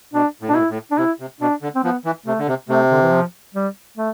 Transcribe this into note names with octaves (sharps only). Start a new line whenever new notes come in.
B2 D4
A2
B2 D4
A2 E4
A2
D4
C3 E4
C3
B2 D4
D3
C4
F3 B3
E3
C3 A3
D3
C3
C3 A3
D3
E3
F3
G3
A3